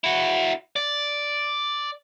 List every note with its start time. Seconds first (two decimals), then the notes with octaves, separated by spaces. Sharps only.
0.04 E4 F#4
0.76 D5